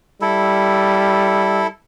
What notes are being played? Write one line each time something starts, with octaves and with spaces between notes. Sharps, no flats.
G3 E4 A4